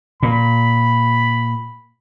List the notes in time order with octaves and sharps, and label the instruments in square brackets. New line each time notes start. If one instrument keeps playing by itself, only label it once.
[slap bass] A#2 [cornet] B5